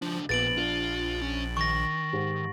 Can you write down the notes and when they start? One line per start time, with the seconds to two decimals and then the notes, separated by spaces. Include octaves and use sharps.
0.02 C#2 F3 D4
0.29 A#1 A#2 B3 A6 D7 F#7
0.57 D4 F4
1.21 C#4
1.57 D#3 C#6 A#6
2.13 G#2 G4